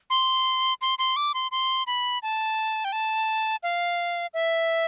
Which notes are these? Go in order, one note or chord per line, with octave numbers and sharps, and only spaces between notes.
C6
C6
C6
D6
C6
C6
B5
A5
G5
A5
F5
E5